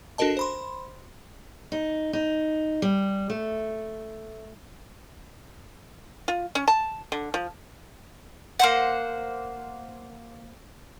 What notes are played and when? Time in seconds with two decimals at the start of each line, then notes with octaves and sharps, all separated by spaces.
0.18 D4 F#4 A4 A#4 D#5 A5
0.37 C5 B5 C6
1.72 D#4
2.13 D#4
2.82 G3
3.30 A3
6.28 F4
6.55 C#4
6.68 A5
7.12 D3
7.34 F3
8.59 A#3 C5 F#5